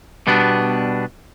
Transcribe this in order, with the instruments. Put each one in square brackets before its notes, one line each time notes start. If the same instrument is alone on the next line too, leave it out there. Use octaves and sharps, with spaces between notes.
[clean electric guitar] B2 G3 B3 D4